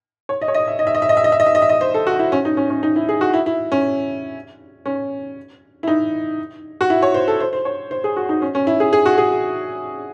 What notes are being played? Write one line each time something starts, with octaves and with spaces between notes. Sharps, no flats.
C#5
D#5
C#5
D#5
E5
D#5
E5
D#5
E5
D#5
E5
D#5
E5
D#5
E5
D#5
E5
D#5
C5
A4
F#4
E4
C#4
D#4
C#4
C#4
D#4
E4
G#4
F#4
E4
E4
C#4
C#4
E4
D#4
F#4
E4
C#5
C5
A4
C5
C5
C#5
C5
G#4
F#4
D#4
C#4
C#4
E4
G#4
G#4
F#4
G#4